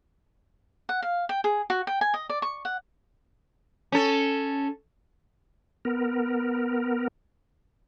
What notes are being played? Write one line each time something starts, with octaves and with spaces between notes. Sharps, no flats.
F#5
F5
G5
G#4
F#4
G5
G#5
D#5
D5
C#6
F#5
C#4 A4
B3 A#4